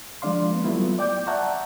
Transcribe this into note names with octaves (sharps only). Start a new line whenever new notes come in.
F3 G#3 D4 D5 F5 C6
A#3 B3
F#3 G3 A3 B3 E4 F4
D5 G5 D6 G6
D5 E5 F#5 A5 A#5 C#6